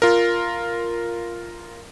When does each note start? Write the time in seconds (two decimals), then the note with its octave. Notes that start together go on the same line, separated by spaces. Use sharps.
0.02 F4 A#4